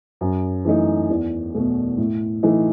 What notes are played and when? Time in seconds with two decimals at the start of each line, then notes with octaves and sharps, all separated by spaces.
0.21 F#2
0.65 E3 A3 D#4
1.10 E2
1.54 B2 A3
1.98 A2
2.43 E3 A3 D#4